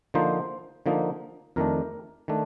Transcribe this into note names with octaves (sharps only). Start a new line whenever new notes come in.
D3 F3 A#3 D#4 C5
D3 F3 A#3 D#4
F2 D#3 A3 D4 A#4
D#3 A3 D4